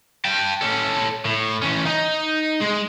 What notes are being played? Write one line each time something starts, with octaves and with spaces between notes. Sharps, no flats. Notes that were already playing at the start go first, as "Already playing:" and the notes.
G5 A5
C#4 A4
A2
E3 C#4
D#4
G#3